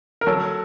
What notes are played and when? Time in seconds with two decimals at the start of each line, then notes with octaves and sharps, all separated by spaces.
0.21 A#4
0.27 F#3 A4